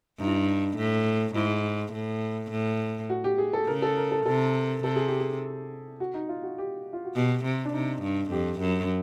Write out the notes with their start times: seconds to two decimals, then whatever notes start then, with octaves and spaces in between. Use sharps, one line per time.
0.20 G2 D#4
0.27 E4
0.34 D#4
0.77 A2
1.35 G#2 E4
1.93 A2
2.51 A2
3.09 F#4
3.24 G4
3.38 G#4
3.53 A4
3.67 C#3 A#4
3.82 A4
3.97 A#4
4.11 A4
4.26 C3 A4
4.84 C3 A4
4.96 G#4
5.08 G4
5.20 G#4
6.00 F#4
6.14 D#4
6.29 F4
6.43 F#4
6.58 G4
6.93 F4
7.05 F#4
7.15 B2 G4
7.45 C3
7.65 D4
7.73 C3 D#4
8.03 G2
8.31 F2 G4
8.61 F#2